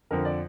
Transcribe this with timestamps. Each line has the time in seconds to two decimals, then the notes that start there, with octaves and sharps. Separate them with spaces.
0.11 F2 D3 F3 A#4
0.25 D5